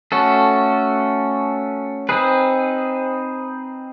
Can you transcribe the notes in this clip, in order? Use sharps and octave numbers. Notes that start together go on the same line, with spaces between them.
A3 C#4 F#4 A4
C4 D#4 G#4 B4